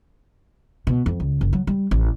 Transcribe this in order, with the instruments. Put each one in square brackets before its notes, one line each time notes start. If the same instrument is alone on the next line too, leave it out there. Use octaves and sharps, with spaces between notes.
[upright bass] B2
F2
C#2
F#1
F#3
G3
A1